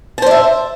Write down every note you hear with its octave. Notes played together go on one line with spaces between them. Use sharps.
C5 D5 E5 A5